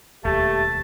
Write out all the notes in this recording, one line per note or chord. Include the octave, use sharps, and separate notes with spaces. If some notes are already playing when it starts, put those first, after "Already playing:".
E1 D#2 A3 G4 A5